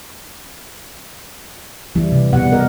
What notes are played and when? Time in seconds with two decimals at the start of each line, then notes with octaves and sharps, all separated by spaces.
1.95 E3 G3 E4
2.12 C3
2.33 B2 G3 F#5
2.52 A#4 D#5